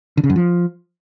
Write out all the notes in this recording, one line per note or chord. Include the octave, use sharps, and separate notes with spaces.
D3
C#3
F#2
F3